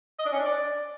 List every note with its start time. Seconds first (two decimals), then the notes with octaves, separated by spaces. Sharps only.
0.19 D#5
0.26 D4
0.32 C#4
0.39 D4
0.46 D5